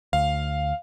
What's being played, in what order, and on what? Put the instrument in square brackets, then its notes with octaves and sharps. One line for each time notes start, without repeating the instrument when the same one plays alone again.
[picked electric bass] D2 [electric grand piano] F5